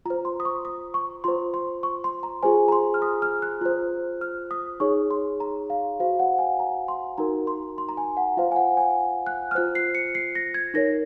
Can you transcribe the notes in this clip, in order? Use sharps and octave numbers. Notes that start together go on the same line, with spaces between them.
F4 C5 A#5
C6
D#6
C#6
D#6
C#6
F4 C5 C6
C6
C#6
C6
A#5
F4 G#4 C5 G#5
A#5
C6
F6
D#6
F6
F#6
F4 C5
F6
D#6
D#4 G#4 C#5 C#6
C6
A#5
F5
F#4 C5 F5
F#5
G#5
A#5
C6
D#4 F#4 A#4 A#5
C6
C6
A#5
G#5
F#5
F4 C5 F5
G#5
F#5
G#5
F#6
F6
F4 C5 F#6
C7
C#7
C7
A#6
G#6
D#4 A#4 C#5 A#6